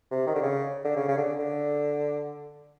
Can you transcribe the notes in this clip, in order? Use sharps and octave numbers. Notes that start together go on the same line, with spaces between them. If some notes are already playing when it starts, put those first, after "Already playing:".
C3
D#3
D3
C#3
D3
C#3
C#3
D3
D3